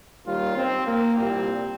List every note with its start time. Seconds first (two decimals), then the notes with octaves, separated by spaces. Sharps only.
0.24 D#2 D#3 G3 F4
0.56 C4
0.86 A#3
1.17 C2 A#2 G3 C4